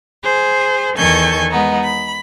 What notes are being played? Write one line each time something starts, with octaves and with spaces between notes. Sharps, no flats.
G#4 C5
E2 D#3 A4 G#5 C#6 G6
G#3 B3 D#4
B5